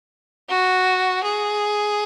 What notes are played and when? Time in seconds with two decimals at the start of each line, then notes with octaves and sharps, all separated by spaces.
0.49 F#4
1.23 G#4